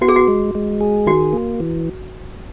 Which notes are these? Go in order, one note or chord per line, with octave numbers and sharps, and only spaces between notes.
B3 F#4
G#4
F#4
G#3
G#3
G#4
D#3 F#4
A#3
E3